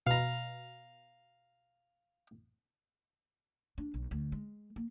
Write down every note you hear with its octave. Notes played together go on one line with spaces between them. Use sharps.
B2 F5 A#5
D4
B1
D2
G#3
A#3